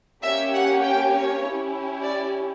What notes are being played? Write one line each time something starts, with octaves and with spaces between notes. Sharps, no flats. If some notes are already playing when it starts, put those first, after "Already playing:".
A#3 C#4 G4 E5
F#5
G5
C#5
C#4 E4 G4
D5